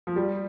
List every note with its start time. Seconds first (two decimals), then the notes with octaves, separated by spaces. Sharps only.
0.07 F3
0.16 G3